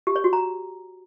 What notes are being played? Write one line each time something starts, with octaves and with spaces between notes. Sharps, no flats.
G4
C#5
F#4
A#5